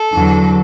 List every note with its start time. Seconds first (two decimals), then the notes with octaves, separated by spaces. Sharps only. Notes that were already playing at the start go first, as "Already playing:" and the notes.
Already playing: A4
0.12 E2 D3 F#3